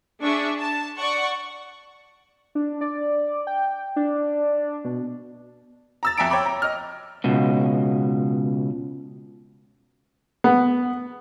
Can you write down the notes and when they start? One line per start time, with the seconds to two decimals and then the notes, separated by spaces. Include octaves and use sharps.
0.22 D4 G#4 E5 C#6
0.59 A5
0.98 D5 F#5 C#6
2.55 D4
2.81 D5
3.47 G5
3.96 D4
4.85 B2
6.03 A#5 E6 A6
6.17 F2 E5 A#5 D7
6.30 C#5 G5 A#5 B5 D6
6.46 A#5
6.62 D#5 F6
7.24 C#2 B2
10.44 B3